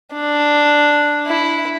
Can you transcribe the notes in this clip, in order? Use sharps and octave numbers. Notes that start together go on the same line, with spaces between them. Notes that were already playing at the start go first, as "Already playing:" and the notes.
D4
E4